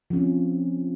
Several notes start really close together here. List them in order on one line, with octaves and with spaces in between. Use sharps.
F3 C#4 C4